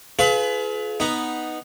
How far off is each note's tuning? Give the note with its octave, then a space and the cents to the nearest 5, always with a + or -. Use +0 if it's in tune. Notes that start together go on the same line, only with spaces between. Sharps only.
F4 +0 G#4 +45 B4 +20
B3 +0 D#4 +0